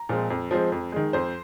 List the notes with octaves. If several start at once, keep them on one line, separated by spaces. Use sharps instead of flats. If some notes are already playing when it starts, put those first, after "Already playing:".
Already playing: A#5
A#2 F3 G#3 C4
F2
F3 G#3 C4
F2
D#3 G#3
F2 C5